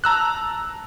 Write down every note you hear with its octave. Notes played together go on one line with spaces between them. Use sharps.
A5 A#5 E6 F#6